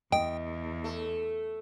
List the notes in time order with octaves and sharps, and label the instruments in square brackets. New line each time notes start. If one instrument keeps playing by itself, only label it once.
[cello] E2 [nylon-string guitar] D#5 [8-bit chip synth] G5
[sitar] A3